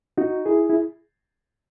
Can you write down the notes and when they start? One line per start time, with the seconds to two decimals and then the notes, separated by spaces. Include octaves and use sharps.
0.18 D#4 F#4
0.46 E4 G#4
0.69 E4